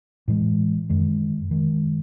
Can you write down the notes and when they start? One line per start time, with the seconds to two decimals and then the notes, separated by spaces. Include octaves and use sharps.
0.28 A2 E3 G#3
0.89 F#2 D#3 G#3
1.50 F#2 D#3 G#3